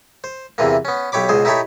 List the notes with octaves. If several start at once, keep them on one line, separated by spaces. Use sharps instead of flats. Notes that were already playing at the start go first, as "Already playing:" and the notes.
C5
E2 C3 E3 A#3
B3 C#4
B1 G4 C#5 B5 D6
C#2 B2 G#4 C5
D#4 E4 G4 A4 C#5 B5